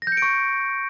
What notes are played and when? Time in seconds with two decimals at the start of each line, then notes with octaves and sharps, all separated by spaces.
0.02 A#6
0.07 G6
0.12 C#7
0.17 D7
0.22 C#6